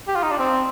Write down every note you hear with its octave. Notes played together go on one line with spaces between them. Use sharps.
G4
F4
D#4
D4
C4